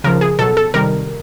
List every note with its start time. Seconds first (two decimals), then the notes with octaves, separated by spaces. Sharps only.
0.04 C#3 F3 A#4
0.21 G#4
0.39 B2 F#3 A4
0.57 A4
0.74 C3 D#3 G3 A#4